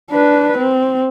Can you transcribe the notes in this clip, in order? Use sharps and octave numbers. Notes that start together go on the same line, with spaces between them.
D4 B4
C4